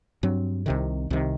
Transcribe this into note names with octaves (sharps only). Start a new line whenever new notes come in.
G2 F#3 C4
C2 C3 D#3
C2 C3 D#3